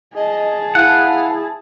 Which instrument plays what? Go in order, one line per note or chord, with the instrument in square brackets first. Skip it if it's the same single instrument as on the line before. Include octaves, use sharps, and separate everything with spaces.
[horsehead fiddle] G#4 A5 [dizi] D#5
[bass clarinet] E4 [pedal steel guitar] B4 F#5 [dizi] F5